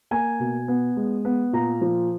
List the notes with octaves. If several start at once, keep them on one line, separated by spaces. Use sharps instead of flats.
A#3 G#5
B2
B3
G#3
B3
A#2 A#5
F3